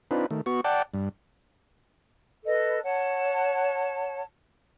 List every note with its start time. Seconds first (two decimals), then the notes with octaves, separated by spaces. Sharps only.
0.11 C4 D4 D#4 F4 B4
0.30 D#3 A3
0.46 B3 F#4 C#6
0.64 D5 F#5 G5 A5
0.94 G2
2.45 A4 B4 D#5
2.84 C#5 F#5 A5